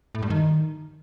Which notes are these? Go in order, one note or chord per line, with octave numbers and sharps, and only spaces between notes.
A2
G2
D#3